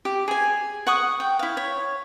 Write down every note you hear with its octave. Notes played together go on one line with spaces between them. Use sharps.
G4
G#4 G#5
F#5 C#6 D#6
G5
E4 F5
C#5